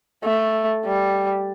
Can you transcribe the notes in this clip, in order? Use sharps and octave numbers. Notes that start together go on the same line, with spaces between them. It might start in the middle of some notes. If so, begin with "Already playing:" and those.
A3
G3